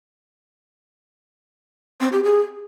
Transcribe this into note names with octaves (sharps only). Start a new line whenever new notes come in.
C4
G4
G#4